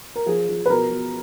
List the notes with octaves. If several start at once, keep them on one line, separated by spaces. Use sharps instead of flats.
A#4
F3 G#4
F3
B4
B2 A#4
B2